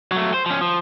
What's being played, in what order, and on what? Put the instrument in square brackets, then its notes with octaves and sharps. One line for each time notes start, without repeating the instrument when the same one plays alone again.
[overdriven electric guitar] F#3 A3
C5
F3 C#4
F3